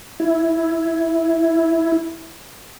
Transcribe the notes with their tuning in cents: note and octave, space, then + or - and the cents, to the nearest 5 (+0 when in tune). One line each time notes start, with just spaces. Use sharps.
E4 +0